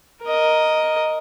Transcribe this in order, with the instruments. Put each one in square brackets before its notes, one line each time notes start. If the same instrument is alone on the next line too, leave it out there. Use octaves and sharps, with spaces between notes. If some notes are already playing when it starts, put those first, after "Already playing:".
[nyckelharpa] A#4 D#5